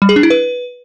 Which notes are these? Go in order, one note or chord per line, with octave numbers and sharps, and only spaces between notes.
G3
G#4
D4
E4
B4